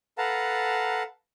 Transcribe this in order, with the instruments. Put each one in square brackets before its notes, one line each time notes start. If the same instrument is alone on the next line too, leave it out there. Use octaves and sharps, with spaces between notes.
[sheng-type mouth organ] A4 B4 F5 F#5 A5 A#5